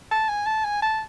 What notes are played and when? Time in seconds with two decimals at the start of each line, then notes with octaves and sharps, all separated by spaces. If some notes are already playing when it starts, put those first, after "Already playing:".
0.11 A5
0.29 G#5
0.46 A5
0.65 G#5
0.82 A5